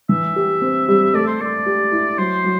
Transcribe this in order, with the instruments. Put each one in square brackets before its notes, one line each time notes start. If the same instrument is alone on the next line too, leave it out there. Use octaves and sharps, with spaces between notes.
[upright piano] E3 [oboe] E5
[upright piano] G4
C4
G3
[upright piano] A3 [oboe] D5
[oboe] C5
[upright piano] A3 [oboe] D5
[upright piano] G4
E4
[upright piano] F#3 [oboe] C5
[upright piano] F#3